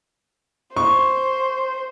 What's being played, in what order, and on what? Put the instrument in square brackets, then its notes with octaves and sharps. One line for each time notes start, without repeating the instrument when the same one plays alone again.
[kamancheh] C5 [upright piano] C#6